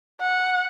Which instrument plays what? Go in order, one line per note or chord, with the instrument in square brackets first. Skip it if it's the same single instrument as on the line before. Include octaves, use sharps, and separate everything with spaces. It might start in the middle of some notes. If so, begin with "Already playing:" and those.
[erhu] F#5